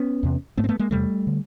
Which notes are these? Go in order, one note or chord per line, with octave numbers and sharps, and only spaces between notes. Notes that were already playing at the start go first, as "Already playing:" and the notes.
Already playing: B3 C#4
E2 C3
G#2 A3 B3
C4
A3 B3
G#3 A#3
E2 C3 G3 A3
D3